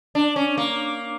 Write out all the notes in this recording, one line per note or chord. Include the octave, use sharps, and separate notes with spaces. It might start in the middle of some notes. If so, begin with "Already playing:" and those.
D4
C#4
A#3